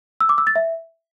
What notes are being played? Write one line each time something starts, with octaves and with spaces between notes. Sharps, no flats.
E6
D6
E6
A6
E5